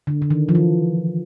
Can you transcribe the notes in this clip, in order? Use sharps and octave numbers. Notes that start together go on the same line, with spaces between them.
D3
D3
D#3
F3
E3